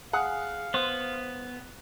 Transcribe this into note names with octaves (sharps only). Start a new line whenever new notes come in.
G#4 F5 F#5
B3 C5